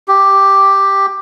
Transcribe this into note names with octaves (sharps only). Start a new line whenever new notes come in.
G4